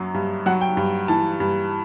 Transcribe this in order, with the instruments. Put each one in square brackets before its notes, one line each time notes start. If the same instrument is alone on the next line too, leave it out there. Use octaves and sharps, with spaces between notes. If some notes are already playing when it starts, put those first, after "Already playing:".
Already playing: [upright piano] F#2 F#3
G2
F#3 F#5
G5
G2
E3 A5
G2